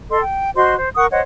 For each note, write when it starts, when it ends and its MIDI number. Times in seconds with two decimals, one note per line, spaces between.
0.09 0.20 69
0.09 0.20 75
0.09 0.20 84
0.22 0.49 79
0.55 0.75 66
0.55 0.75 72
0.55 0.75 75
0.55 0.75 84
0.78 0.90 72
0.96 1.07 70
0.96 1.07 78
0.96 1.07 85
0.96 1.07 87
1.11 1.20 72
1.11 1.20 73
1.11 1.20 75
1.11 1.20 78